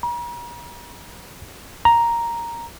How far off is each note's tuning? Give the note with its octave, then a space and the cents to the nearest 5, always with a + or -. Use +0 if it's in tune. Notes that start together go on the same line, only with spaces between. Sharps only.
A#5 +40
A#5 +0